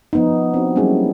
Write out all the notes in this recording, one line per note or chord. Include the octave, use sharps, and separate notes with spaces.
F3 B3 D#4
C4 D4 F#4
F#3 G3 A#3 C#4 E4 G#4